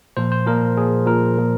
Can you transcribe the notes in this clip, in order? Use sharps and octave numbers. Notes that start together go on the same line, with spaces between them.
A#2 F3 C5
C5
A#2 F3 A#4
A#2 F3 G#4
A#2 F3 A#4
A#2 F3